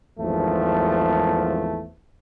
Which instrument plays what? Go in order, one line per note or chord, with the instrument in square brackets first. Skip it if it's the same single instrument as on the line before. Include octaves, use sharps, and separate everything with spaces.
[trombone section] G#1 E2 F3 A3